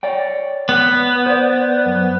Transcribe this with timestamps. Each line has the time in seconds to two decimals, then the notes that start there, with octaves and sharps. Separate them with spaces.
0.03 C#5 D5 G5
0.69 B3
1.26 C5 D5
1.86 F#2